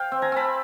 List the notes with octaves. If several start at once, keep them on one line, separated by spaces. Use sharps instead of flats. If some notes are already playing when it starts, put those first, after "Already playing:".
Already playing: F5 G5
C4
G#5 A#5
C4 A5 B5